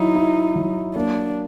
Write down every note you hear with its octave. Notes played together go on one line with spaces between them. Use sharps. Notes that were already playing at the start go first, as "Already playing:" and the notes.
Already playing: F#3 D#4 E4
E4
F#3
A#3 D4